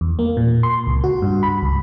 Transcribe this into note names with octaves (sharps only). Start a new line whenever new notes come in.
E2
A#3
A#2
C6
C#2
F#4
G2
B5
C#2